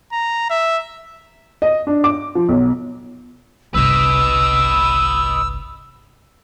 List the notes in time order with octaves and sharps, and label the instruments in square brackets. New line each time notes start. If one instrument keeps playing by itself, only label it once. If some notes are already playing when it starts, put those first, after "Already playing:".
[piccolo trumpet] A#5
E5
[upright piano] D#5
D4
D6
F3
B1
[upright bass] G1 C2 [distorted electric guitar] B4 D#5 [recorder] E6